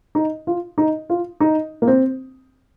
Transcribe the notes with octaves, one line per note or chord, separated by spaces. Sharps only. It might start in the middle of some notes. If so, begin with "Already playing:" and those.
D#4
F4
D#4
F4
D#4
A#3
C4